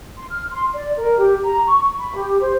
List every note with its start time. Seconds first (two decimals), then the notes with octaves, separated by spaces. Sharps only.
0.17 C6
0.30 F6
0.50 C6
0.73 D5
0.97 A#4
1.17 G4
1.43 A#5
1.66 C#6
1.98 B5
2.16 G4
2.41 C5